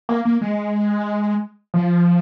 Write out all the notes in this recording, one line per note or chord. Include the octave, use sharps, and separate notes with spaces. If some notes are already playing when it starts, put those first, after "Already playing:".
A#3
A#3
G#3
F3